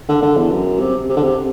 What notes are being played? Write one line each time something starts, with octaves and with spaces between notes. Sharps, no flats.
D3
D3
E2
F#2
C3
C3
D3
C3